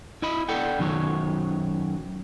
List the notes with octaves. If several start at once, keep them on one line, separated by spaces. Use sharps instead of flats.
E4 D#5 B5
A4 D5 F#5 G5
F#2 D#3 F#3 C#5